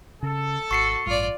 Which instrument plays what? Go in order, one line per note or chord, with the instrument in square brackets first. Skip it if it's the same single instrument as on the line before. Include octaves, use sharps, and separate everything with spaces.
[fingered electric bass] C#3 [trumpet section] A4
[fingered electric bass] G#1 [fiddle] F#4 [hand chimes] C#6 C7 C#7
[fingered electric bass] A1 G2 [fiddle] F4 D5